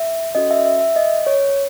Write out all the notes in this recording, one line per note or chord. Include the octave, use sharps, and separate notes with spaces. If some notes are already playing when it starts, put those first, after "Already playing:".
Already playing: E5
C#4 F#4 A4 D#5
E5
E5
E5
D#5
C#5